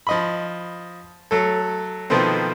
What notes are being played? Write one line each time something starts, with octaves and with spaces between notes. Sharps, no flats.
F3 D#5 B5
F#3 A3 A4
B2 D#3 F3 A3 B3 C4